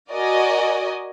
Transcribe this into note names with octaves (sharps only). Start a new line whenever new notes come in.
F#4 A#4 D5 D#5 G#5